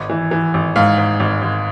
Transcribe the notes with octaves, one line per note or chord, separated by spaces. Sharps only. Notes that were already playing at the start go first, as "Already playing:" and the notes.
Already playing: G#1
E3
E3
G#1
G#2 F5
G#2
G#1
G#1